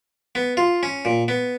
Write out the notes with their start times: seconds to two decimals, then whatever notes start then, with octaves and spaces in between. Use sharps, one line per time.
0.35 B3
0.57 F4
0.83 C#4
1.05 A#2
1.28 B3